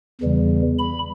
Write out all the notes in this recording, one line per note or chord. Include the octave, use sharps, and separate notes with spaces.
E2 C#3 E3 G3
B5